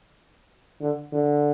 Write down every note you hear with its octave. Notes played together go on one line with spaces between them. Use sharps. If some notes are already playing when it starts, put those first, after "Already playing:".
D3
D3